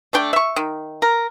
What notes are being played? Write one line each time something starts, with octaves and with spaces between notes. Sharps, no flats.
A3 D4 G5
E5 C#6
D#3
A#4